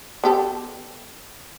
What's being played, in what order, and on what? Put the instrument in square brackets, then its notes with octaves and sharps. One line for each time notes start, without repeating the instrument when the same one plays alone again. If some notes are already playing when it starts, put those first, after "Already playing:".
[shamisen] B3 G4 A4